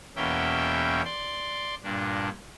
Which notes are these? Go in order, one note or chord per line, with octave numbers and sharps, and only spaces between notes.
E2 B2 A#3 C#4 E5 G5
D5 C6
G2 A#2 D4